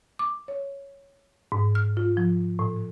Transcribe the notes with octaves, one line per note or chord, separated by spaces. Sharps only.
D6
C#5
G#2
F6
F4
F3
A2